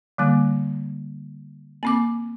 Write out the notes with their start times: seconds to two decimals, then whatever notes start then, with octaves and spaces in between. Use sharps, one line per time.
0.18 D3 G3 A#3
1.83 A#3 C4 D6